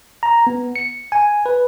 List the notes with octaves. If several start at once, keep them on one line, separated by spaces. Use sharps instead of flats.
A#5
B3
C#7
G#5
B4